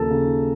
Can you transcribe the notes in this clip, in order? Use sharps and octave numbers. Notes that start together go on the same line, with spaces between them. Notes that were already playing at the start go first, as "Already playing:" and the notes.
Already playing: D#2 C#3 F3 A4 A#4 A5
C#3